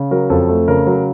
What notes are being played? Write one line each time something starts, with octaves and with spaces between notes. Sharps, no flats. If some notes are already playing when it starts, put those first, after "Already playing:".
Already playing: C#3
F#3 A#4
F2 A4
A3
C#3 A#4
F#3